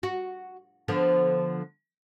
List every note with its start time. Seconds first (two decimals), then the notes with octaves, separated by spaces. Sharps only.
0.03 F#4
0.88 D3 F3 B3